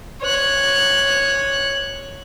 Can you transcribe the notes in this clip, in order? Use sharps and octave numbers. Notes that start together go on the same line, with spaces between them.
C#5 F#6